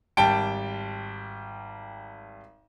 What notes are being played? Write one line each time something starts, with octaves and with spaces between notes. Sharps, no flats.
G#1 G3 G5 A5 D7